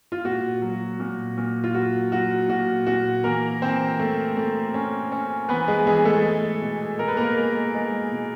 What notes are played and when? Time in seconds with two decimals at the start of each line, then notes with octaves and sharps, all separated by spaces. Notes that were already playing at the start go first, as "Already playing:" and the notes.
0.12 F4
0.25 A#2 F#4
0.62 F#3
1.00 A#2
1.38 A#2
1.64 F4
1.74 F#3 F#4
2.12 F#3 F#4
2.49 A#2 F#4
2.87 A#2 F#4
3.24 E3 A#3 A#4
3.62 E3 C4 C5
3.99 A3
4.37 A3
4.74 C#4
5.12 C#4
5.49 E3 B3 B4
5.68 G#3 G#4
5.87 E3 G#3 G#4
6.05 A3 A4
6.23 G#3
6.61 B2
6.98 B2 A#4
7.08 B4
7.17 A#3 A#4
7.37 G#3
7.74 G#3
8.11 B2